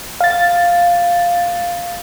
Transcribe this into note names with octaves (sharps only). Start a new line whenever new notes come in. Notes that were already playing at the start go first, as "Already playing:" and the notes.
F5 A6